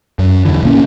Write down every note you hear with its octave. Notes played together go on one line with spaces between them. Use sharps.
F#2
E2 D3 E3
A1 A#2 A#3 C#4